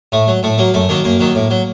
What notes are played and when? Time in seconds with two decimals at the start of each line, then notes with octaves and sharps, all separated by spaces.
0.12 A2 A3
0.28 F#3
0.43 A2 A3
0.58 F#3 A#3
0.74 F#2 A3
0.89 D#3 F#3 A#3
1.04 F#2 A#3
1.20 D#3 F#3
1.35 A2
1.50 F#3